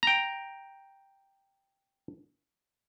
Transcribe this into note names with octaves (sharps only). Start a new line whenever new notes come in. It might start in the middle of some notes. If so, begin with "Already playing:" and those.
G5 A#5